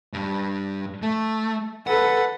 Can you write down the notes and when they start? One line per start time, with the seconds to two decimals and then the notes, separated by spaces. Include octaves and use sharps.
0.13 G2 G3
1.02 A3
1.87 A4 B4 F#5